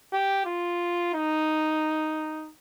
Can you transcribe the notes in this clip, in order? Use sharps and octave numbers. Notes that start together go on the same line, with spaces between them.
G4
F4
D#4